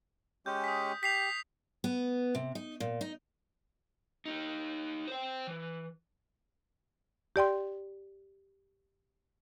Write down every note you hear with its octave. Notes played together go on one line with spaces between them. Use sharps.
G#3 C#4 G4 G6
D#6 B6
G4 B6 C7 F7
B3
C3
D#4
A#2
D#4
D#4 G4
C5 G5
E3
G4 D5 G5 C6